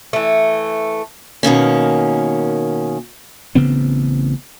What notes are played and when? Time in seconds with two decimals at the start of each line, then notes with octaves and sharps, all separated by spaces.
0.13 E3 A3
1.43 B2 D#3 A#3 C#4
3.55 A1 C#3 B3 C4